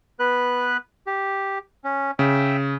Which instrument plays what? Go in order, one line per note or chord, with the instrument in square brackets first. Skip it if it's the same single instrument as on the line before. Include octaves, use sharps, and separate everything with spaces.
[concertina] B3 B4 F#6
G4
C#4
[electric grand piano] C#3 [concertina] E5 G5